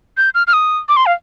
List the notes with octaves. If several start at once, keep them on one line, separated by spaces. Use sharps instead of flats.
G6
F6
F6
D#6
D6
C6
F5